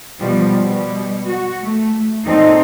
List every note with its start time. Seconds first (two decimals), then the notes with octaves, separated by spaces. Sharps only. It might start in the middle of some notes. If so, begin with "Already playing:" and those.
0.17 B2 F3 G3
0.59 B2 G3
1.26 F#4
1.62 A3
2.24 A#2 C4 D#4 A4